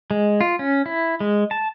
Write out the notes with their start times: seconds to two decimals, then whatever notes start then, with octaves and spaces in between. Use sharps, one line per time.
0.11 G#3
0.41 F4
0.59 C#4
0.86 E4
1.20 G#3
1.51 A5